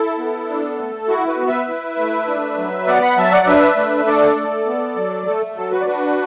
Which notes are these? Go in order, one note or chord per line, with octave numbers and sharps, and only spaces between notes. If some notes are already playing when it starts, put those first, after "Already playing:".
Already playing: E4 A4
B3
D4
A3
E4 F#4
F#4 B4
B3
B4 E5
E4
A3
D4
F#3
B3 D5 F#5
F#5 B5
F#3 E5 A5
D5 F#5
D4 B4 E5
A3
D4 A4 D5
A3
B3
F#3
A3 A4
F#3 A4
F#4 B4
D5
D4 F#4 B4